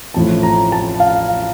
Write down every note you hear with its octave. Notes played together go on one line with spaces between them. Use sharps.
A1 A2 F3 C4 A5
A#5
A5
F5